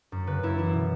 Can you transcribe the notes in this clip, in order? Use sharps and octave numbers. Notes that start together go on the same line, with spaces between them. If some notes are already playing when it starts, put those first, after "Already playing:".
F#2
C#3 B4
F#2 E4
E3 E4
B2